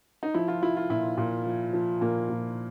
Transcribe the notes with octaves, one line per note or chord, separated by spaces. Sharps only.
D#4
F3 E4
F4
F3 E4
F4
A#2 E4
A#2
F3
F3
A#2 A#3
A#2